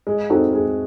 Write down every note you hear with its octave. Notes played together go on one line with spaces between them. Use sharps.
G#3
C4 D#4 F#4 A4
G#3